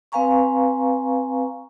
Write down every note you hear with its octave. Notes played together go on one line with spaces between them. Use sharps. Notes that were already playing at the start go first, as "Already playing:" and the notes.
C4 B4 F5 G#5 A#5 C#6